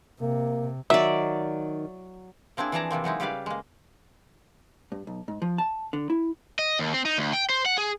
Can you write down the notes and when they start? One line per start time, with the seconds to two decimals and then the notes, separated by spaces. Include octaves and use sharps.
0.21 C3 A#3
0.90 D#3 F#3 D5 E5
2.57 A#3 C4 D4 E4 G#4
2.72 E3 F3 G#4 D5 A5 A#5
2.90 C3 E3 A#3 C4
3.04 F#3 G#3 D#4 E4
3.20 C#3 G3 G4 B4 D5 F5
3.46 G#3 A#3
4.92 G2
5.07 B1
5.28 G#2
5.42 F3
5.58 A5
5.93 D3
6.10 E4
6.59 D#5
6.79 D#2
6.94 C4
7.05 D#4
7.18 D2
7.33 G5
7.50 C5
7.66 F#5
7.78 G#4